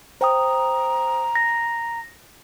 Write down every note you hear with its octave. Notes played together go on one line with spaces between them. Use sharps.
C5 G5 A#5 D#6
A#6